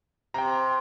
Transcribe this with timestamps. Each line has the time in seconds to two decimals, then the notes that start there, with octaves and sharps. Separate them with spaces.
0.34 C3 G5 A#5